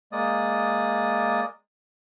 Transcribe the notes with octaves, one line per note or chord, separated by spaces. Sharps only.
G#3 A#3 D5 D#6